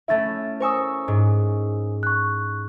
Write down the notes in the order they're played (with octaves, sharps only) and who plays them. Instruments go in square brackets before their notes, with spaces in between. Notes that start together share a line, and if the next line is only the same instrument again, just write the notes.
[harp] A3 C#4 E4 [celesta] E5 A6
[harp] A#4 C#6 E6 [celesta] C5 G#5 D#6
[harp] G#2
[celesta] C#6 F#6